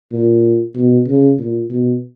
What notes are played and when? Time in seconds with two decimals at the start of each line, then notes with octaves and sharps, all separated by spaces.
0.13 A#2
0.75 B2
1.07 C#3
1.38 A#2
1.70 B2